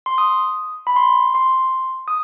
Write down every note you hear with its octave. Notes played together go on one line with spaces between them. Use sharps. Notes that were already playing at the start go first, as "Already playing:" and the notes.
C6
D#6
B5
C6
C6
D#6